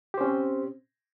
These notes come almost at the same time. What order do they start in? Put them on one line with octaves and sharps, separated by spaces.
G4 C5 C#4 C4